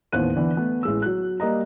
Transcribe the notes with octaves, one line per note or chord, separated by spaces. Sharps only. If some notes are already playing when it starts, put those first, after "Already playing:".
A1 D#2 B3 C5 F#6 D#7
D3 E3 B3
A3 B3
A1 G#3 E6
F#3 F#6
G3 A#3 D#5 A#5